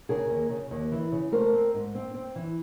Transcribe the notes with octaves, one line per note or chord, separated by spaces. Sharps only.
C#3 G#4 A#4
D#2
C#3
D#2
E3
C#3
A3 A#4 C5
C4
G#2
C4
C4
E3